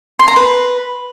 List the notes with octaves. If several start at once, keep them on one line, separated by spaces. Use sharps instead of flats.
C6
A#5
B4